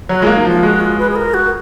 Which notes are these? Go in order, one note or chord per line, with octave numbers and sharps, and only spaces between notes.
F#3 F#4
G#3 A#3 F4
D#4
F3 F4
G#3 F#4
F4
B4
G#4
A#4
F#4